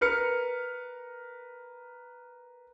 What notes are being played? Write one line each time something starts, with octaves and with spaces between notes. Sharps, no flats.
A#4 B4 F6 C#7